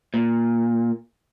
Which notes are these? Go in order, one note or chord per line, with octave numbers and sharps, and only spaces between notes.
A#2